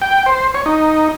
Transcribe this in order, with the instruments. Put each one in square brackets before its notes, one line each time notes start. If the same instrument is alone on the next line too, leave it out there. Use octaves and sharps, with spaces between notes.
[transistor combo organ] G5
C5
C#5
D#4